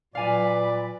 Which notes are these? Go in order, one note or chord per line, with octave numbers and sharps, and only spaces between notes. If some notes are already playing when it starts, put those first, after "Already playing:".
A#2 F#3 B4 D5 F5 G#5